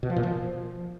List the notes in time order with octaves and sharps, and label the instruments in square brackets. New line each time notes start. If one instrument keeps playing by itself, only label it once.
[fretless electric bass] B2
F3
A#2
F3